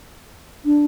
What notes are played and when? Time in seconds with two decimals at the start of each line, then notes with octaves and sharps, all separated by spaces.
0.65 D4